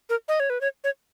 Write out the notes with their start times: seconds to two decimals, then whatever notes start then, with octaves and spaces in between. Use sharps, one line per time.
0.10 A#4
0.28 D#5
0.40 C#5
0.50 B4
0.61 C#5
0.84 C#5